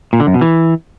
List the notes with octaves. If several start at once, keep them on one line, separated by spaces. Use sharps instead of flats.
A#2
D3
F#2
B2
E3